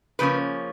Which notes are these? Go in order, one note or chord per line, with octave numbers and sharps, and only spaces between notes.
C#3 F3 A#3 C#4 B4